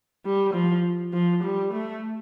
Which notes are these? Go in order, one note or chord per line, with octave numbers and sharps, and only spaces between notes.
G3
F3
F3
G3
A3